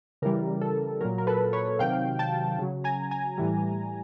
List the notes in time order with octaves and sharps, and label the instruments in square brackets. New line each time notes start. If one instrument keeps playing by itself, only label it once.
[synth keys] C#3 E3 G3 A#4
A4
A#2 F#3 A#4
A#4
A4 B4
B4 C#5
C3 D#3 F#3 F5 G5
G5 A5
C#3 F#3
G#5 A#5
G#5 A#5
A2 E3 G3